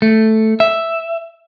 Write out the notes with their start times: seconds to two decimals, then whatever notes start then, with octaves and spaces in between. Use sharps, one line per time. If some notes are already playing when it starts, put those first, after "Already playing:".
0.02 A3
0.60 E5